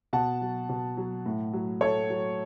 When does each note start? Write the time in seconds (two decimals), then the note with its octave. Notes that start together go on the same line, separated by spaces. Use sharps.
0.13 B2 F#5 A5
0.41 F#3
0.69 B2
0.97 F#3
1.26 A2
1.53 F#3
1.81 A2 A4 C#5
2.10 F#3